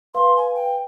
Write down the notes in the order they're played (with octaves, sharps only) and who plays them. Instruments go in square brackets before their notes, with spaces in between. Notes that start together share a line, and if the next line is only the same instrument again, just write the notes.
[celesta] B4 F5 [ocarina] C6
[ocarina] G#5
G5